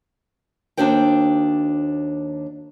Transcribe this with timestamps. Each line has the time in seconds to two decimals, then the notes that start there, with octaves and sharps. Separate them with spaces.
0.77 D#2 C#3 D4 F#4 C5 G5